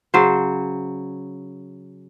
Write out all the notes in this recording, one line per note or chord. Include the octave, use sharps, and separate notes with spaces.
C#3 F#3 C5